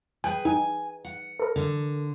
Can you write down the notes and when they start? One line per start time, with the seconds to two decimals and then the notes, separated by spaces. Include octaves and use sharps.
0.24 G#4 B4 G5
0.45 D#4 G#5
1.05 F#5
1.39 A4 A#4
1.56 D3